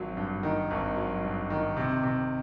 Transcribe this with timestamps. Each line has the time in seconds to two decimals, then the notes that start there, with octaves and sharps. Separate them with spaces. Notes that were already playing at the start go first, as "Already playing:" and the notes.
Already playing: G#1 F#3
0.17 G2
0.43 D#3
0.71 G#1
0.97 F#3
1.24 G2
1.50 D#3
1.77 C3
2.03 C3